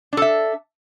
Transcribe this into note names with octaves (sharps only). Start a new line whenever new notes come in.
D4 A4 E5